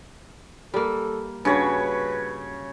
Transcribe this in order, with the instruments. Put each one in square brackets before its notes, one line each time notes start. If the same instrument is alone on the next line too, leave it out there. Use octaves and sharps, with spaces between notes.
[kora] G3 A#3 [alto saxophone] A4
[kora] G2 F#4 [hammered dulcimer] C#3 C#5 [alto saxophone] B4